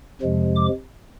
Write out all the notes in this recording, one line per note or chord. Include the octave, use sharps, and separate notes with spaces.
F2 C3 F3 G#3
D6